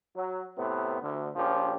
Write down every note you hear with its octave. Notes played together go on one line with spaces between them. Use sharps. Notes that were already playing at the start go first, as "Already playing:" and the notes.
F#3
A2 C3 B3
D2
A#1 F3 C#4 G4